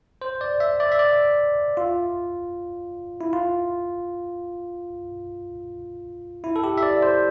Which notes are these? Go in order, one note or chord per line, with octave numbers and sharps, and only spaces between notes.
C5
D5
E5
D5
E5
D5
F4
E4
F4
E4
A4
G4
E5
D5
C5